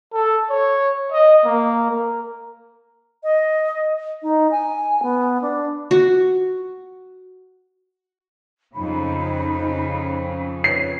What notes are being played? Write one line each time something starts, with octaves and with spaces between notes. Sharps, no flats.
A4
C#5
D#5
A#3
A#4
D#5
D#4
G#5
B3
D4
F#4
F2 C#3 D#4 B5
B4 C#5 C7